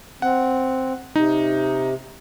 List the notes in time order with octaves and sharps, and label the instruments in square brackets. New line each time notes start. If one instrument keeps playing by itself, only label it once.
[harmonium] C4 [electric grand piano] F#5
[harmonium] C3 [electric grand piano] D#4